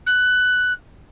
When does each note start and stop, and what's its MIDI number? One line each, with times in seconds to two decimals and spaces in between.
0.06 0.73 90